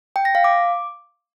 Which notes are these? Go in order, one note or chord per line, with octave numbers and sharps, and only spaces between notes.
G5
A#6
F5
D6